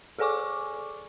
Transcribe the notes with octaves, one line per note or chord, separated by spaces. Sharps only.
G#4 A4 D5 G#5 C#6 D6